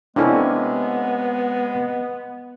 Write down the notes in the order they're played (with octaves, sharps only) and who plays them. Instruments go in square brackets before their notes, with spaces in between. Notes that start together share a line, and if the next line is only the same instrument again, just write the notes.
[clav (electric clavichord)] C3 A#3 C#4 [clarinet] G#3 [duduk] B3 [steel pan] D4 E4 A4